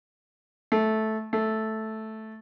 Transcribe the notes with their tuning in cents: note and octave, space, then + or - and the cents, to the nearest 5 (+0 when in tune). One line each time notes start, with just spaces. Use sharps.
A3 -10
A3 -5